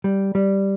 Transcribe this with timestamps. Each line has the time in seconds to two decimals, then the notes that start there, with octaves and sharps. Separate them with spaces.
0.04 G3
0.35 G3